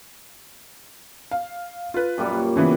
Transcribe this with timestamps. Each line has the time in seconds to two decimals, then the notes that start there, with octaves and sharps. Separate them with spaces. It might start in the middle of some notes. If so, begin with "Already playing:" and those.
1.31 F5
1.94 F4 B4
2.18 F#2 A#2 G3
2.56 C#3 E3 B3